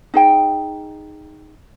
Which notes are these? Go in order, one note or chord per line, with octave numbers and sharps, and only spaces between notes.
D#4 G#4 G5